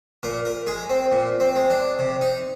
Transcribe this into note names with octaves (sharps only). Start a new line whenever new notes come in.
A#2 A#4
A#4
G#3 G#4
C4
A#2
C4
G#3
D4
C3
D#4